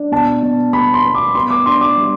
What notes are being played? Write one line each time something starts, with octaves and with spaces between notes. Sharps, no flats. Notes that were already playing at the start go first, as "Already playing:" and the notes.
Already playing: D4
B2 A5
B2
B3 B5
C6
B3
D6
B3 C6
D6
D4 C6
D6
G3